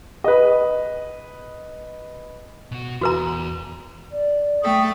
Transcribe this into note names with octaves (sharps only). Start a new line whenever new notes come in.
B4 D#5
B2 F#4
E2 F#4 B4 A#5
D5
A3 A4 G5 C#6 D#6